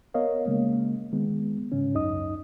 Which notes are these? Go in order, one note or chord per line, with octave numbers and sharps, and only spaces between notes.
B3 A#4 C#5 D#5 F5
C#3 G#3 A#3
D#3 G#3 B3
G#2 C#3 C#4
C#2 F#2 D#4 D#5 D#6